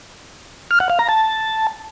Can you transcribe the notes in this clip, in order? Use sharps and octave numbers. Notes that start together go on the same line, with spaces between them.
F6
F#5
F5
A#5
A5